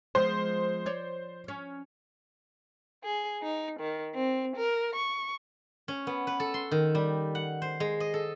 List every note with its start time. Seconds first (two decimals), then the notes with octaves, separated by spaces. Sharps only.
0.15 F3 G#3 B3 C5
0.86 C#5 D5
1.48 C#4
3.04 G#4
3.43 D#4
3.79 D#3
4.15 C4
4.56 A#4
4.95 C#6
5.88 C#4
6.07 B3
6.27 B4
6.40 A4
6.54 C6
6.71 D#3
6.95 G3
7.35 F#5
7.62 C5
7.80 G#3
8.00 D#5
8.14 A4